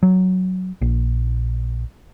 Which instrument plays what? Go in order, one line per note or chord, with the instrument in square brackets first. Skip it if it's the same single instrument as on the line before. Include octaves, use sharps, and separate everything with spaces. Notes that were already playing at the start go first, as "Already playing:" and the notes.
[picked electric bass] F#3
A#1